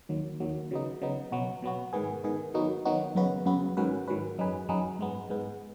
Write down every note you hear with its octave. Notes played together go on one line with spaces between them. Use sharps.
D#2 D#3 F#3
D#2 D#3 F#3
C#3 F#3 B3 D#4
C#3 F#3 B3 D#4
B2 F#3 B3 F#4
B2 F#3 B3 F#4
G#2 D#3 B3 G#4
G#2 D#3 B3 G#4
D#3 F#3 B3 D#4 F#4
D#3 F#3 B3 D#4 F#4
F#2 C#3 B3 F#4 B4
F#2 C#3 B3 F#4 B4
G#2 D#3 F#3 C#4 B4
G#2 D#3 F#3 C#4 B4
F#2 F#3 D#4 G#4 B4
F#2 F#3 D#4 G#4 B4
G#2 G#3 B3
G#2 G#3 B3